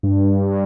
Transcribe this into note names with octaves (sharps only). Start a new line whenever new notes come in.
G2